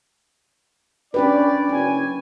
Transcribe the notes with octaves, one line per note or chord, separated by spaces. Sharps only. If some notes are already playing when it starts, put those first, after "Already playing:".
C#4 D4 G4 B4 D5
F#1 C#4 G#5